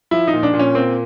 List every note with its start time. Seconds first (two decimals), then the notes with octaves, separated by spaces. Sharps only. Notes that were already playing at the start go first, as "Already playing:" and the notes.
0.11 F3 E4
0.27 D#4
0.33 A#2
0.43 D4
0.54 A#2
0.59 C#4
0.75 A#3 C4